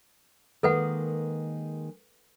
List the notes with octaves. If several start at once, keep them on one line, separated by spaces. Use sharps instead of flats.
D#3 G#3 A#3 A4 B4 F#5